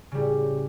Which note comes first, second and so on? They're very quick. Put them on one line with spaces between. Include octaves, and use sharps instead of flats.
C#3 G3 A2